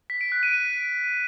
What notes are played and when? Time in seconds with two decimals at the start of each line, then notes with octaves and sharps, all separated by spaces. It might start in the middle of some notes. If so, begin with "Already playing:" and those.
0.10 B6
0.21 D7
0.32 F#6
0.43 D#7
0.54 D7